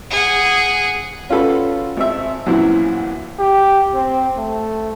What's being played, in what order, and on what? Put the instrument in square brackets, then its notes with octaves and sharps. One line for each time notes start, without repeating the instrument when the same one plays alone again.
[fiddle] G#4 F#5
[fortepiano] C#4 F4 F#4 A4 B4
G#1 C4 E5
A#1 F#2 E3 F#3 C4 E4
[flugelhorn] G4
C4
A3